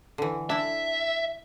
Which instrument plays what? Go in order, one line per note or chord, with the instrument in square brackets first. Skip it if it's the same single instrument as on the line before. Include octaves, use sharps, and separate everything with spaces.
[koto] D3 E3
[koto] D4 E4 [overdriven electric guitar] E5